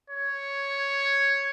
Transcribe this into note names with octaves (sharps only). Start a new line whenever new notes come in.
C#5